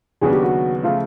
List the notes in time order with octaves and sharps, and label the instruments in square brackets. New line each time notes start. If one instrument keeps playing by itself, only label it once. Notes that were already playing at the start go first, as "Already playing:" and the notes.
[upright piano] D#2 C#3 F#3 B3 D4 [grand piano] G#4
[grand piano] G4
F#4
[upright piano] C#3 F3 A3 [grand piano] F4